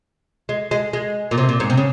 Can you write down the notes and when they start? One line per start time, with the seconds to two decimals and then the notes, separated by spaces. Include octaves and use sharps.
0.49 G#3
0.71 G#3
0.93 G#3
1.31 A#2
1.38 C3
1.49 A#2
1.60 G#2
1.70 C3
1.77 C#3